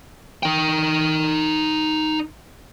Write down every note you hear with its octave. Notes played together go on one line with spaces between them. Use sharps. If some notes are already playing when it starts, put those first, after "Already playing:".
D#4 G5